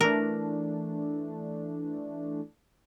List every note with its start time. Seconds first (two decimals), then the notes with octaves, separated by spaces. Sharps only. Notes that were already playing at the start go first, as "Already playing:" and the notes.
0.01 E3 A3 D4 A#4